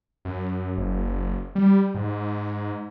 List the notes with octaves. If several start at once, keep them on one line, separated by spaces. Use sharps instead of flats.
F#2
F#1
G3
G#2